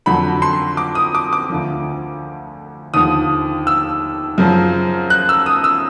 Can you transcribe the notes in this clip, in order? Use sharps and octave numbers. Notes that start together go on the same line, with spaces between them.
F2 D3 F#3 B5
C6
D6
D#6
D6
D6
D2 D3 F3
D#2 D3 F3 D#6
E6
F#2 C#3 F3
F#6
E6
D#6
E6